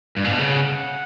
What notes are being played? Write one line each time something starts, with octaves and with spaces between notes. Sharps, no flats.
G2
A#2
B2
C#3 F#5